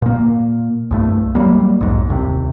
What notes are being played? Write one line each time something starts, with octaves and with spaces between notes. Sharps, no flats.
A#2 A#3
C2 G2 A3
F#3 G3 A#3
B1 F2 G#2
D#1 C2 C3